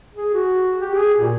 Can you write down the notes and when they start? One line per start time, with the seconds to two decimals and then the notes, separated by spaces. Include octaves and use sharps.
0.15 G#4
0.34 F#4
0.81 G4
0.95 G#4
1.19 A#2